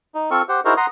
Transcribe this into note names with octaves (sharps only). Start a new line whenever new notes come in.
D#4
C4 F4 A4 C#6
G4 C5 F#5
D#4 E4 F#4 G#4 A#4 C5
F#5 A#5 C6 D#6